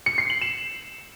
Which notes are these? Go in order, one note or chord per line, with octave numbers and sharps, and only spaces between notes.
C#7
C7
F#7
E7